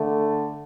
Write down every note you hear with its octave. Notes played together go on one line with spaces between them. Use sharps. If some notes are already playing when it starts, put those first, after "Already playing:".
Already playing: D3 A3